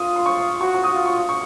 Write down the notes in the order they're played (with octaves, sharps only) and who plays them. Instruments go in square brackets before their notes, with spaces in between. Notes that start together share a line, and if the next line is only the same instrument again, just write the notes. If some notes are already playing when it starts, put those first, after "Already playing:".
Already playing: [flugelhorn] F4 [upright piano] D#6
[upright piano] C6
C#6
[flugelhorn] F#4 [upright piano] C#6
[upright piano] C#6
D#6
[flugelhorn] F4
[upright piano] C#6
C#6